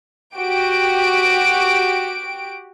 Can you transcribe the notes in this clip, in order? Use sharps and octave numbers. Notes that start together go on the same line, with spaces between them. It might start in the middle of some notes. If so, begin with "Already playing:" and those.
F#4 G4 D7